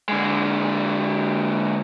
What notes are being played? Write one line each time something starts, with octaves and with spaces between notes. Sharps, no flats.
D3 G#3